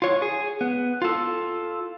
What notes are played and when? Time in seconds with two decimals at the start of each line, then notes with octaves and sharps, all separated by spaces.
0.02 F4 C#5
0.22 G#4
0.61 B3
1.02 F4 A4